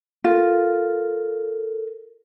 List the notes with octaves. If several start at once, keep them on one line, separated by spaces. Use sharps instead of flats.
F4 A4 A#4